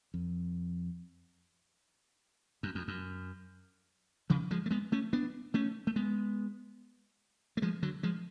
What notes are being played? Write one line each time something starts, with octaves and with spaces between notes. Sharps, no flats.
F2
F#2
F2
F#2
C#3 F3
F3 G#3
A3
G#3 B3
A3 C#4
B3 D4
A3 C#4
A3
G#3 B3
A3
F3 G#3
D3 F#3
F3 G#3